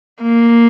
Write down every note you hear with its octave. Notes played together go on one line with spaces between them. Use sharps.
A#3